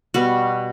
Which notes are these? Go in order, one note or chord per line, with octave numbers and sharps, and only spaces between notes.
B2 G3 B3 F#4